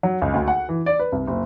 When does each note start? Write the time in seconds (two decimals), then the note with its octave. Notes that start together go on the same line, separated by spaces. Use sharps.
0.03 F#3
0.22 C#2
0.34 D2
0.48 F#5
0.69 E3
0.86 D5
0.99 B4
1.12 C2
1.27 F#1